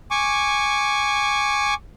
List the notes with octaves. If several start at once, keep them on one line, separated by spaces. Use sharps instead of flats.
G#5 C#6 D6